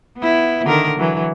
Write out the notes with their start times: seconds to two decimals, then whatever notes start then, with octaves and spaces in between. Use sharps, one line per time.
0.18 B3 E4
0.66 D3 D#3 A#4
0.99 E3 F#3